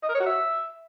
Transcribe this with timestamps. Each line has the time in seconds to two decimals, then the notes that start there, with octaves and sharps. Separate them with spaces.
0.03 D#5
0.09 A#4
0.15 C#5
0.20 F#4
0.26 E5